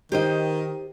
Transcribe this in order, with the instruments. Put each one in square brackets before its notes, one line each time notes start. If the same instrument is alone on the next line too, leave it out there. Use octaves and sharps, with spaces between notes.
[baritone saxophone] D#3 [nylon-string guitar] G4 C5 D#5